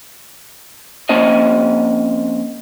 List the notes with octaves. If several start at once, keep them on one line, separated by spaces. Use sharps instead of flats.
F2 A#3 C#4 C5 D#5